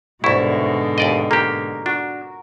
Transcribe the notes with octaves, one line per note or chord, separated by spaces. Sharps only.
C2 G#2 B2 D3 E4 C#6
D#2 D5 D#5
A#3 G4 A#4
D4 F#4